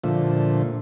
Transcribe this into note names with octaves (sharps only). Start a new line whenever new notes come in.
A#2 D3 F3 A3